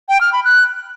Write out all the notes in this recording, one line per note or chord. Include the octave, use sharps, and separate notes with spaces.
G5
F6
B5
F#6